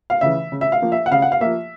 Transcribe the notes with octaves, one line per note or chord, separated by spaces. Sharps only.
F5
C#3 E3 E5
C#3
E5
F5
F3 A#3
E5
F#5
C#3 F5
F#5
F5
F3 A#3 E5